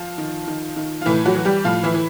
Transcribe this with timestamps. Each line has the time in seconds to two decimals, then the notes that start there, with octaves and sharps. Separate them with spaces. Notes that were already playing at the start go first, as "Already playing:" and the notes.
Already playing: F3 F4
0.18 D#3
0.47 D#3
0.76 D#3
1.01 F4
1.06 A2 E3 E4
1.26 F#3 F#4
1.35 E3
1.45 G3 G4
1.65 A2 F3 F4
1.83 E3 E4
1.94 E3